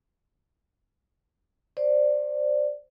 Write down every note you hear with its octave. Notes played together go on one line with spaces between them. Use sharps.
C5 D5